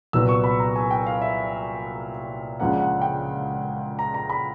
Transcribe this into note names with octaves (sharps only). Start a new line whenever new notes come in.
C2 A#2 F#3 B3 E6
C#6
B5
A#5
G#5
G5
F5
E5
C#2 C#3 F3 A#3 D4 F#5
F#5
G5
A#5
A#5
B5